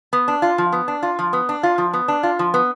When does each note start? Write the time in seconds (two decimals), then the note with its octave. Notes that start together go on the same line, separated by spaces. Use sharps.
0.13 B3
0.28 D4
0.42 F4
0.58 F3
0.72 B3
0.88 D4
1.03 F4
1.19 F3
1.33 B3
1.49 D4
1.63 F4
1.78 F3
1.93 B3
2.08 D4
2.23 F4
2.39 F3
2.54 B3